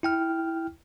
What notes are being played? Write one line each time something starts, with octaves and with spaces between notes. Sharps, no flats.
E4 G5 F6